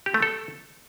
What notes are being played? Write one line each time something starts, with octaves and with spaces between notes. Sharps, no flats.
G4
A3
A4